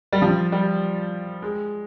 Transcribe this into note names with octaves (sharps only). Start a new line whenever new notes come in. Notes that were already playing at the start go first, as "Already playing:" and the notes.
G3
F3
G3
G#3